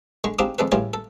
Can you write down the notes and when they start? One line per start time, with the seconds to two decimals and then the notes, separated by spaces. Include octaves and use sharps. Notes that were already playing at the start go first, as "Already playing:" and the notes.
0.24 D3 G#3 C#6
0.39 G#3 C4 D4 D#4 F4 G4
0.59 F2 G#3 A4 B4
0.72 A2 C#3 E3 G3 C#4 F4
0.94 A4